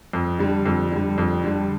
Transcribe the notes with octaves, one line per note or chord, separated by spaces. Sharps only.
F2
D3 G3
F2
D3 G3
F2
D3 G3